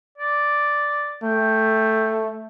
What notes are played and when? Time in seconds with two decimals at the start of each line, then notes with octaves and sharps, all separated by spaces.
0.18 D5
1.23 A3 G5